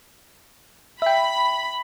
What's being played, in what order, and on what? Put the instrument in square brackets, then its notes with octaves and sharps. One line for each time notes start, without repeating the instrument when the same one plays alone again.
[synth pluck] E5 G5 [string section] B5